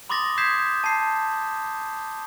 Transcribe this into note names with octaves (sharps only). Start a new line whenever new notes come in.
B5 C6 D6 D#6 A6 A#6
D#6 G6 G#6 B6 C7 E7
A5 C7